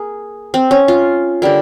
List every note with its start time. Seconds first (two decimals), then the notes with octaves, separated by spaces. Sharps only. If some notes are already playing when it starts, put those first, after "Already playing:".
Already playing: A#3 G#4
0.54 C4
0.71 C#4
0.88 F4
1.42 D3 G3 A#3